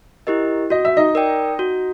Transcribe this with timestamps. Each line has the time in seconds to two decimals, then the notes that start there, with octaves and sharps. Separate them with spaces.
0.27 E4 G4 A#4 D#5
0.70 F#4 D#5
0.85 E5
0.97 D#4 D#5
1.15 A#4 D5 G5
1.59 F#4